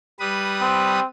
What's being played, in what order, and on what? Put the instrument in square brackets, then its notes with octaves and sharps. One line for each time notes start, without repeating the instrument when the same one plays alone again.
[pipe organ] G3 B4 D#6
[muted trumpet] C4